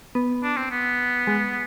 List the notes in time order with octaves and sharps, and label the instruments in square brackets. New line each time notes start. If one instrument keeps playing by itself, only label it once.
[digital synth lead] B3
[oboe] D4
C4
B3
[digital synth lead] G#3